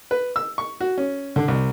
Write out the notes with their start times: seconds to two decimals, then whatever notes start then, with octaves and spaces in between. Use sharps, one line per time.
0.11 B4
0.36 E6
0.58 C#6
0.81 F#4
0.98 C#4
1.36 D3
1.48 C2